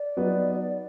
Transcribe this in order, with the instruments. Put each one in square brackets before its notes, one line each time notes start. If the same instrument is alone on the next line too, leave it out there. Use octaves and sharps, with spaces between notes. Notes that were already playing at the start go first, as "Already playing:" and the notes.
Already playing: [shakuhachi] D5
[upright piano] F#3 B3 D#4